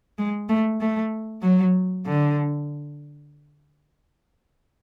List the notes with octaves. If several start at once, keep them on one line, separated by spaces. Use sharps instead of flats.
G#3
A3
A3
F#3
D3